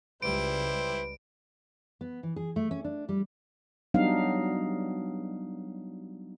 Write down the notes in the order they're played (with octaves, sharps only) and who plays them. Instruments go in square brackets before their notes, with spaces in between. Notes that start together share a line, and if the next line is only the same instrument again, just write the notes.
[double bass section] C#2 G3 [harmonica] E4 G4 C5 [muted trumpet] B4 [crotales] D7
[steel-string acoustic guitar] B3
E3
G#4
A3
C#4
D4
G3
[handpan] F#3 G3 B3 D4 D#4 F5